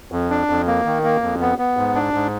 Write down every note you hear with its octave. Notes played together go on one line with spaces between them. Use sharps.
F2
D4
F2
A#3
D#3
A#3
F2
B3
B3
G#2
D4
G#2